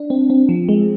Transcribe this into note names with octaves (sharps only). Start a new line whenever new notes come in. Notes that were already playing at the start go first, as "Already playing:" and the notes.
Already playing: D4
C4
C4
F3
G#3